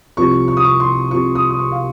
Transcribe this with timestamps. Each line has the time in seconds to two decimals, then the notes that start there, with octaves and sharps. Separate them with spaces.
0.17 C2 C3 F3 C#6
0.48 C#6
0.57 D#6
0.64 C#6
0.80 C6
1.11 C2 C3 F3 C#6
1.35 D#6
1.50 D#6
1.59 C#6
1.72 F5